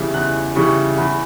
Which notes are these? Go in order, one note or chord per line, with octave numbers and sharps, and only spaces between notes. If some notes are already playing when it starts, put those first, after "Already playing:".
Already playing: E2 C#3 E3 G3
E2 F#6
C#3 E3 G3 C#6
E2 B5